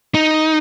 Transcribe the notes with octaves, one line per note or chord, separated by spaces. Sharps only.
D#4